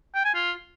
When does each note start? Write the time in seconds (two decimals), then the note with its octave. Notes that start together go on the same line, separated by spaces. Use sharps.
0.15 G5
0.25 G#5
0.34 F4